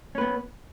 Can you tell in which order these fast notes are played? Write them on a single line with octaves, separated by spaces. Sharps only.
C#4 B4 B3